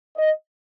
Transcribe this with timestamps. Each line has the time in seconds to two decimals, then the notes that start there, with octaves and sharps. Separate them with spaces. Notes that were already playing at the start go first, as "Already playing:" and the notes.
0.16 D#5